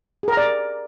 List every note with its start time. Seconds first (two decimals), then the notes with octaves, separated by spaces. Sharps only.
0.23 G#4
0.28 A#4
0.33 A#5
0.37 D5